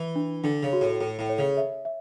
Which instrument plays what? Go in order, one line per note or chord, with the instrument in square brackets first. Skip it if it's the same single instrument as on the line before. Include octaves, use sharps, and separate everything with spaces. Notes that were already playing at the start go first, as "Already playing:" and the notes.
Already playing: [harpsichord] E3
[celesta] D4
[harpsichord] D3 [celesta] D4
[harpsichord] C#3
[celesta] F#4
[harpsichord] A2
[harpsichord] A2 [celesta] A4
[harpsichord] A2
[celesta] C#5
[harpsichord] C#3
[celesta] E5
E5